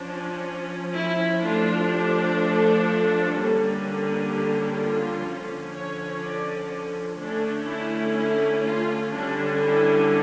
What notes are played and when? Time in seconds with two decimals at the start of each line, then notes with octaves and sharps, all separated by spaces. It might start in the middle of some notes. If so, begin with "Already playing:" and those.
Already playing: F3 C#4 D4
0.92 E4
1.40 F3 A3 D4 F4
1.88 G4
2.37 A4
3.34 D3 G3 A#3 C#4
4.30 G4
4.78 F4
5.26 D3 F3 C#4
5.74 C#5
6.22 D5
7.18 D3 A3 C#4 D4
7.67 E4
8.16 E4
8.63 F4
9.11 D3 G3 C#4 D4
9.59 E4